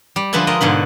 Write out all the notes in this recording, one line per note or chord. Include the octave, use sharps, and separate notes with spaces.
G3
D3 F3 G#3 B4 E5 A5
G#3 A#4 D#5
G#2 B2 D3 B4